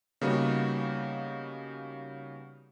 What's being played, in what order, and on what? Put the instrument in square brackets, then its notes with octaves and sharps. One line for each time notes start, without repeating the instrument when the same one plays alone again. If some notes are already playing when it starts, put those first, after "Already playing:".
[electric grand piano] C#3 G3 A#3 B3 D#4 F#4